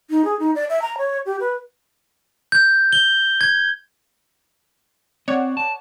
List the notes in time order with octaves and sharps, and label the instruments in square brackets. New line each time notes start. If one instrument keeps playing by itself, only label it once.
[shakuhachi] D#4
G#4
D#4
D5
E5
A#5
C#5
G4
B4
[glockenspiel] G6
G7
G#6
[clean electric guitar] C4 [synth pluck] C#5 D5 F#5
[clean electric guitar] A5